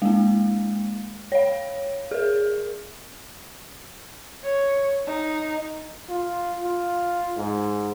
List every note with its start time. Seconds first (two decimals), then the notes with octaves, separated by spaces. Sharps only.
0.02 G#3 A#3
1.32 C#5 F5
2.11 G#4 A#4
4.44 C#5
5.07 D#4
6.09 F4
6.64 F4
7.37 G#2